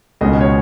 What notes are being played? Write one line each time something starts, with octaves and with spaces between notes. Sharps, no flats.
C#2 B2 G#3 C#4 D#5
C#5